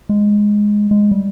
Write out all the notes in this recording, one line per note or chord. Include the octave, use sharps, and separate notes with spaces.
G#3
G#3
G3